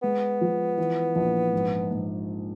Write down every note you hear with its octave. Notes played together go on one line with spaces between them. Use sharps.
G#3 B3
F3
E3
A#1
G#2
G#2